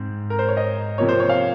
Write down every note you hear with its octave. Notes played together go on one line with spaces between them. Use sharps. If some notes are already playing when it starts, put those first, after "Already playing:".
Already playing: G#2 C4
A#4
C5
C#5
D#5
C3 F3 A#3 C#5
C5
C#5
F5